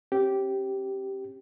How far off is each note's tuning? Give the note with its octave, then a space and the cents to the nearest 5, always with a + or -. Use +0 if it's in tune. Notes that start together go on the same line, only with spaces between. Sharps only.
C#4 -35 G4 -10